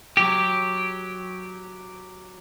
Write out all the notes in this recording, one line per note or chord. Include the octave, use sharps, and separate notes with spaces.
F#3 G4